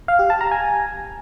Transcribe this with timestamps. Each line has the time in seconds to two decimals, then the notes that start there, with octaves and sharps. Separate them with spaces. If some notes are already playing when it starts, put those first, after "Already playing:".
0.08 F5
0.19 G4
0.30 A5
0.41 A#5
0.51 G#5